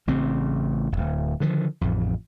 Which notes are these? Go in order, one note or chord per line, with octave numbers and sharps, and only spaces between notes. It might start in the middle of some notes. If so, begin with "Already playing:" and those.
A1 C#3 C4
D1 G#1
D3 D#3 F3
A1 F2